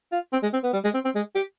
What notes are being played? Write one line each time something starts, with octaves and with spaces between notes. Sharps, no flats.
F4
C4
G#3
C4
B3
G3
G#3
C4
C4
G#3
G4